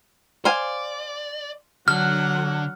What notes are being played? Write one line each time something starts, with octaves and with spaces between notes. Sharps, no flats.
C5 D5 F5 G#5
D3 F#3 F#5 F6